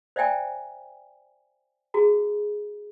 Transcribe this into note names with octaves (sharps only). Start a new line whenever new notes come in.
C5 D5 E5 G5 G#5 A#5
F#4 G#4 A#5